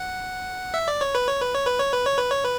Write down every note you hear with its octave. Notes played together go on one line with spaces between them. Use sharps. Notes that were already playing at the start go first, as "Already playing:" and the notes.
Already playing: F#5
E5
D5
C#5
B4
C#5
B4
C#5
B4
C#5
B4
C#5
B4
C#5
B4